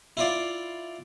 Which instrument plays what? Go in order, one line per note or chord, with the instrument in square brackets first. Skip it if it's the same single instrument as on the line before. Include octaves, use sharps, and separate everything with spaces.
[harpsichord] E4 F4 D5